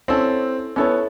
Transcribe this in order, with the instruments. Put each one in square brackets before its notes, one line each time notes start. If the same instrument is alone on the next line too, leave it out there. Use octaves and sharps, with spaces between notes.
[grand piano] C4 [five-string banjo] C#4 E4 A4 C#5
[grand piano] B3 [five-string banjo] C#4 E4 A4 C#5